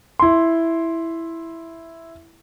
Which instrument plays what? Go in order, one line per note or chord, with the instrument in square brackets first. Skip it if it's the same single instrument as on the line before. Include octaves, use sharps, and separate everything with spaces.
[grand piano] E4 C6